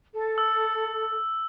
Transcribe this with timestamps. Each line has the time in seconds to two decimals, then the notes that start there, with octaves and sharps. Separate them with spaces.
0.13 A4
0.38 E6